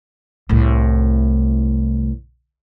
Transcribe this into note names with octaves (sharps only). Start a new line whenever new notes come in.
C2 A2